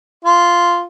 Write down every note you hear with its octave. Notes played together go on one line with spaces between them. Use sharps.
F4